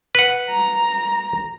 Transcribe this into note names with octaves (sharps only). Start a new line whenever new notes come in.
B4 F#5
A#5